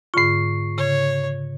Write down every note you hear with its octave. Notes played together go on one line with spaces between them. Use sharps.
G#2 D3 F4 C#6 C7
C#3 C#5